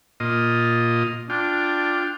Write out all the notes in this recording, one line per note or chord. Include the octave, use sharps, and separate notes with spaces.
A#2 F4 D#5
D4 F4 G5